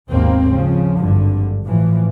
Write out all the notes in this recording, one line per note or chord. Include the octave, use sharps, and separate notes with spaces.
G#1 D#2 B2 A#3 C4
C#3 F3
G#1 G2 D3
A2 E3 F3